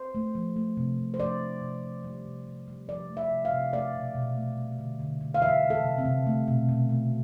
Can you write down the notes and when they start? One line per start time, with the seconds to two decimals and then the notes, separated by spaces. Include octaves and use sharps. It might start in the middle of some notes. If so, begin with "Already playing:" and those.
Already playing: C5
0.15 A3
0.35 F3
0.56 A3
0.77 C3
0.98 C3
1.14 C5
1.19 F3 D5
1.41 A3
1.62 C3
1.83 C3
2.04 G3
2.26 C3
2.46 C3
2.68 G3
2.89 F3 D5
3.10 A3
3.17 E5
3.31 C3
3.45 F5
3.52 C3
3.73 A3 D5
3.95 B2
4.15 B2
4.37 A3
4.57 G3
4.79 D3
5.00 D3
5.21 G3
5.34 F5
5.42 E3 E5
5.63 G3
5.70 A4
5.84 C3
5.98 C4
6.05 C3
6.27 A3
6.48 B2
6.69 B2
6.89 A3